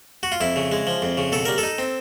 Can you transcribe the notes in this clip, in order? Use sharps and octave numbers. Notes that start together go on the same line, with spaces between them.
F#4
F4
F2 E4
C#3
G#3
F3
F2
C#3
B2 A4
G3 A#4
D#4 A4
C4